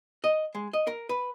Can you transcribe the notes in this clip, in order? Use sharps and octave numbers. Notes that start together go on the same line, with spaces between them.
D#5
G#3
D#5
A#4
B4